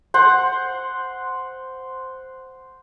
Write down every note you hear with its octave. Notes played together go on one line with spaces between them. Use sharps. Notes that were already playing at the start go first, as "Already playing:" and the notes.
C5 F#5